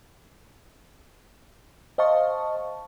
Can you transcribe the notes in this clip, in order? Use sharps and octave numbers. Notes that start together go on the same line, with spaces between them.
C5 D#5 F5 A5 C#6